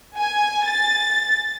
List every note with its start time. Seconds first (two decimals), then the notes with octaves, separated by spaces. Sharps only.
0.18 G#5
0.68 A6